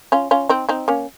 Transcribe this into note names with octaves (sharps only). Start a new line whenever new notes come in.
C#4 F4
C#4 F4
C4 D#4
C4 D#4
A#3 C#4